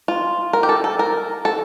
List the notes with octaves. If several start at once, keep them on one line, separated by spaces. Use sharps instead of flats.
F4
A#4
G4
A4
A4
A#4
A4